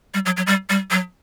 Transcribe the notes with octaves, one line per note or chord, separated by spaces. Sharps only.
G3
F#3
F#3
G3
G3
F#3